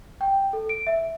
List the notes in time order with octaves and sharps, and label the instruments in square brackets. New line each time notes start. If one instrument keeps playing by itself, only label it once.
[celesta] G5
A4
D7
E5